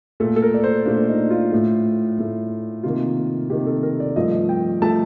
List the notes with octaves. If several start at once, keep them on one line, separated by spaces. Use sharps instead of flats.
A#2 A3 A4
A4
A#4
D5
C5
A#2 A3 D4
D#4
F4
A2 A3
A2 A3
C3 D#3 A#3 F4
C3 D#3 A#3 G4
A4
A#4
D5
G2 F3 A3 D#5
G5
F3 A3 A5